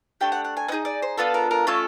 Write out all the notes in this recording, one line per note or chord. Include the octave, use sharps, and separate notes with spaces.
A3 D4 G4 G5
F#5
F#5
G#5
B3 D#4 G#4 D#5
D5
C5
B3 D4 F4 A4 B4
A#4
A#4
A3 C#4 F4 A4 D5